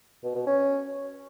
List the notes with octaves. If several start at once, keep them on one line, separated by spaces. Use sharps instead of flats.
B2
B2
C#4